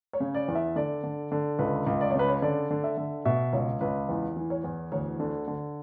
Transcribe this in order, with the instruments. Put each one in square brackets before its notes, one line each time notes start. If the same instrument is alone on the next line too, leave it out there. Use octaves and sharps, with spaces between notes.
[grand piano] C#5
C#3
D5
E2
E5
D3 D5
D3
D3
C#2 B4
C#2
D5
C#5
C#3 B4
C#5
D3 D5
D3
E5
D3
B2 E5
C#2 C#5
C#2 B4
E2
E3
C#5
E2
D2 C#5
D3
D3